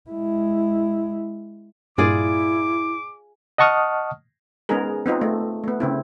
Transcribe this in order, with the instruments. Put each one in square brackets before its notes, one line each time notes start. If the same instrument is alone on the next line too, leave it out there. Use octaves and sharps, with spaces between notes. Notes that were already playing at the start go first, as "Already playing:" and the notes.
[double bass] G#3 E4
[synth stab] G2 A#2 [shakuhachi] E4 [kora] F4 G#4 D5 [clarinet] D6
[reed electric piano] D#5 F#5 A5 C#6 D#6 F6
[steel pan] G#3 B3 C#4 D#4 G#4 A#4
B3 C4 D#4 F4
A3
A3 B3
C#3 C4 E4